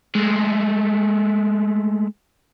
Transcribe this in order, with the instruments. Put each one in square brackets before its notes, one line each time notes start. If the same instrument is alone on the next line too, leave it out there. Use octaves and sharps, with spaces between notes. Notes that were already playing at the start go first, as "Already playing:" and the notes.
[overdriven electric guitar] G#3 A3